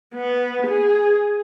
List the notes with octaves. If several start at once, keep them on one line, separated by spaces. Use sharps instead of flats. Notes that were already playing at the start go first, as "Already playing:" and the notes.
B3
G#4